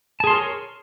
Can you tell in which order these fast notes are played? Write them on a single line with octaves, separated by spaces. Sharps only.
A5 G#4 C6 A#4 C#5